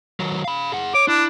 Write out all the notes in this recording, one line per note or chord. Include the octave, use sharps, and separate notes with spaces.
D#3 F#3
F5 B5
G#4 F#5
C#5 D6
D4 E4